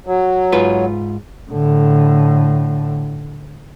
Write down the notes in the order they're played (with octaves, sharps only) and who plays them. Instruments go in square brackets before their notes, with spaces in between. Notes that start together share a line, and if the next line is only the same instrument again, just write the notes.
[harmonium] F#3
[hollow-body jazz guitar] G#2 F4 B4
[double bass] A2 D3